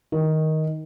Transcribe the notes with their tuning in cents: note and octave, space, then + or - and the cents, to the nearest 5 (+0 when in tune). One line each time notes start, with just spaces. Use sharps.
D#3 +10